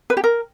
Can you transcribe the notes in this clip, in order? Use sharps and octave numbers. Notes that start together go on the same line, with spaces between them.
B4
G4
A#4